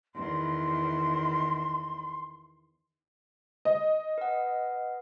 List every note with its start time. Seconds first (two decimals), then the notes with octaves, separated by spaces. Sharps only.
0.15 E2 D#3 C6
3.65 D#5
4.18 B4 F#5